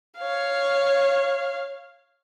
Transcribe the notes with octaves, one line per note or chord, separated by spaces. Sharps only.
C#5 F5